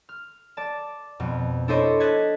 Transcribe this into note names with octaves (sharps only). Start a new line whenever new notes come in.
F6
D5 A5
F2 B2
D4 E4 A4 C5 C#5 D#5
D#5 A5 F#6 G#6 B6